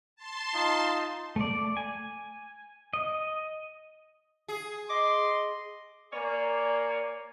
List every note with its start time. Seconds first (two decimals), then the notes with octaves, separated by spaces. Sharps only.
0.16 A5 C6
0.54 D#4 F4
1.36 A3 D5
1.77 G#5
2.93 D#5
4.48 G#4
4.90 D#5 C6 D6
6.13 A#3 C#5 D5 G#5